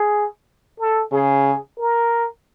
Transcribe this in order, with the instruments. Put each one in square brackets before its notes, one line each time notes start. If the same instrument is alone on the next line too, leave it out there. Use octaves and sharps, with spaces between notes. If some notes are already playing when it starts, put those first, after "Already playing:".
Already playing: [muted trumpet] G#4
A4
[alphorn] C#3 [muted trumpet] G#4
[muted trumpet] A#4